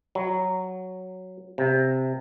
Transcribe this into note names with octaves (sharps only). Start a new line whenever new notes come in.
F#3
C3